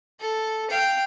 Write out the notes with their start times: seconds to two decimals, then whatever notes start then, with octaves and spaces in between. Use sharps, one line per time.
0.20 A4
0.70 F5 G5